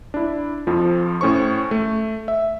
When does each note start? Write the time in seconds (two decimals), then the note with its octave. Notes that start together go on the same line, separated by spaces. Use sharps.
0.14 D4 E4
0.67 F2 F3
1.21 A2 C#4 C5 C#6
1.71 A3
2.28 E5